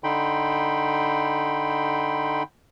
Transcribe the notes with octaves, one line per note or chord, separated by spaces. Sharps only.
D3 D#4 G5 B5 C6